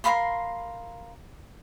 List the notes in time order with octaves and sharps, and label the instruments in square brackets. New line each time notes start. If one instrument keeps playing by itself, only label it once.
[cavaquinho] A#4 F5 B5 C6